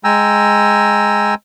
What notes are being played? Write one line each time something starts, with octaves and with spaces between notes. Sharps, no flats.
G#3 G5 G#5 A#5 E6